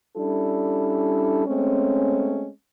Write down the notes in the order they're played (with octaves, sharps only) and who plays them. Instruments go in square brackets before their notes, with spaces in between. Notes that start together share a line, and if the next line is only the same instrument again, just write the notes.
[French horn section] G3 C#4 D4 E4 A4
G#3 A3 C4 C#4